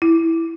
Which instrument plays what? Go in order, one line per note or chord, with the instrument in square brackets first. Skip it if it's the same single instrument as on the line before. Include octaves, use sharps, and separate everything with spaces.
[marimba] E4